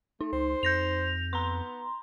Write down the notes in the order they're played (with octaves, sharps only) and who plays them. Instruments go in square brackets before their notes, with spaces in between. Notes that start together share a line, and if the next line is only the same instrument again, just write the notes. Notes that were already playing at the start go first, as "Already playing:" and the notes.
[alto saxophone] A3 [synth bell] D#4
[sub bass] C#2 [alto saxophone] C5
[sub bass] F2 [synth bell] G6 A#6 F7
[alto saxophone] B3 [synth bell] A#5 C6